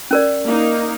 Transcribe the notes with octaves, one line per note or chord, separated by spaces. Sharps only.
C#4 A#4 D5
A#3 D#4